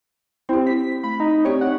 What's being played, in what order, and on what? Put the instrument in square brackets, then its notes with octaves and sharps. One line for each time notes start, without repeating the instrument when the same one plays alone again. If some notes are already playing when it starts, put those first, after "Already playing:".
[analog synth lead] C4 [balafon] E4 G4
[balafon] C4 E4 [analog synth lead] B6
[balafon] A3 [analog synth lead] B5
[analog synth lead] D#4
[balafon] C4 G4 D5 [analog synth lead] C#5
[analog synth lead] F#5